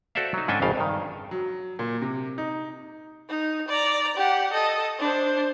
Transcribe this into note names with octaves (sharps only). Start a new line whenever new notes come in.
F#4 A4 C5 D5 E5 F5
F#3 D#4
G#2 C#4 D4 A4 G5 G#5
G#1 F2 C#3 F5
G2 D#3
F#3
A#2
C3
D#4
D#4
D5 A#5
G4 F#5
A4 D#5
D4 C5